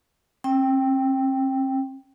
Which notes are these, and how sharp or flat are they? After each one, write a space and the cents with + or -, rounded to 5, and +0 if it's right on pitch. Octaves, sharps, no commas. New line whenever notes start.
C4 +45 G5 +0